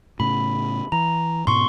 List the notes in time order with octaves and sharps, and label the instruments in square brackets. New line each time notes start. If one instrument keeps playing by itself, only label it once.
[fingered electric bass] A2 C#3 [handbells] B5
[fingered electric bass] E3 [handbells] A#5
[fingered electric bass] G#2 B2 B3 [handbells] C6 C#6